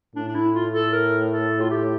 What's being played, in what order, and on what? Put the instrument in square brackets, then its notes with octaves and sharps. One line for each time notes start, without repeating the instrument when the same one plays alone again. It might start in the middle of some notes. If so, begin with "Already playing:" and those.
[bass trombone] A2 [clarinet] D4
[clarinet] D4
E4
F4
A4
A#4
A4
F4
G4